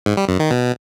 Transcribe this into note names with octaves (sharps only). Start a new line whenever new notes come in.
G#2
G3
F#2
D#3
B2